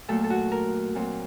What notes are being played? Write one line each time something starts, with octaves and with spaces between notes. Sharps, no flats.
A#2 F#3 A3 A4
A4
F#4
A#4
A#2 F#3 C4